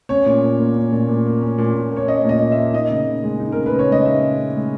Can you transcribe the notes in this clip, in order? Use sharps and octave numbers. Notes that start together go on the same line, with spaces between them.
C#4 C#5
A#2
A#2
A#3
C#4
A#2
A#2
A#3
C#4
A#2
A#2
A#3
C#5
C#4 D#5
A#2 D#5
A#2
E5
A#3
D#4 D#5
C#3
C#3
G#3
D#4
C#3 A#4
B4
C#3
C#5
G#3 D#5
D#4 E5
C#3
C#3
G#3